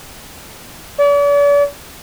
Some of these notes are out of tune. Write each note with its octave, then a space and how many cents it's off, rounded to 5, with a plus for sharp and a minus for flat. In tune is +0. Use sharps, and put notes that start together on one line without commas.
D5 -45